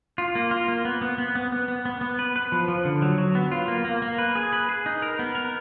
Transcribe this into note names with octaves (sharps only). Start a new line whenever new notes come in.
F4
A#3
F4
A#3
B3
B3
B3
B3
B3
B3
B3
B3
B4
B4
F3
F3
D3
F#3
F#3
B3
F4
A#3
A#3
A#3
B4
G#4
B4
G#4
D#4
A#4
B3
A#4